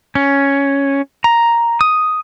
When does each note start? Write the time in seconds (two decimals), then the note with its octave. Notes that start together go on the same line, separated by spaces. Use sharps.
0.15 C#4
1.24 A#5
1.81 D#6